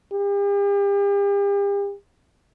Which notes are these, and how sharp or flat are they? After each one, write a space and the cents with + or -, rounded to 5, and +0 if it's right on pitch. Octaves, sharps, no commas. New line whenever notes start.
G4 +40